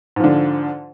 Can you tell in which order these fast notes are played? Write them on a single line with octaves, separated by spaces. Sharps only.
G#2 F3 D3